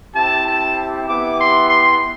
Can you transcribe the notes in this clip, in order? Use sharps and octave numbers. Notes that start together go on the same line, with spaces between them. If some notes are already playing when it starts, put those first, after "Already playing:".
C4 E4 G4 A5
A5
B3 E4 G4 D6
C6
C6